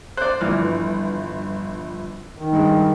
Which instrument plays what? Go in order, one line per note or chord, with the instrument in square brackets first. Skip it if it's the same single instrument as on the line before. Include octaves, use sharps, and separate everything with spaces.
[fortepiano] C5 D5 [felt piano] F#6
[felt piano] G1 F3 F6 [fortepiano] E3
[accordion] D#3
[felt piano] G2 G#3